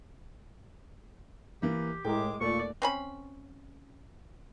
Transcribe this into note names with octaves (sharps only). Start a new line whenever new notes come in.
E3 A#3 G4
A2 G#3 A#4 G5 D6
D#2 A#2 A3 D5 C#6
C4 C#4 B5